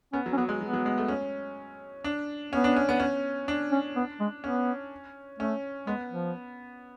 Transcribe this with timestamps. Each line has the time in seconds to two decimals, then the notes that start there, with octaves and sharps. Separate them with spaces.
0.13 B3 C#4
0.26 F#3
0.33 C#4
0.37 F#3 B3
0.49 G#3
0.61 F#3 B3
0.73 F#3
0.86 G#3
0.98 A3
1.08 C#4
2.04 D4
2.52 B3 C#4
2.64 D4
2.76 C#4
2.89 B3
3.00 C#4
3.48 D4
3.71 C#4
3.96 B3
4.20 G#3
4.43 B3 C#4
5.39 A3 C#4
5.87 G#3 B3
6.11 F3